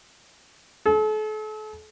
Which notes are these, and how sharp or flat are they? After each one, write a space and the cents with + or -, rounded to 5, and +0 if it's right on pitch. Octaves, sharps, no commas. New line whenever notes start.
A4 -40